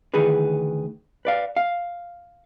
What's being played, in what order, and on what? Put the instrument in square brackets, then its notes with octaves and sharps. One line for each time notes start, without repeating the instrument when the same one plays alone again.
[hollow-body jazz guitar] D2 D#3 E3 G#4 B4
B4 D5 F5
F5